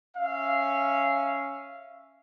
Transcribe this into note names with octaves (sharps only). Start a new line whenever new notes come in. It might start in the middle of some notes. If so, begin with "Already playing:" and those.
C#4 E5 F5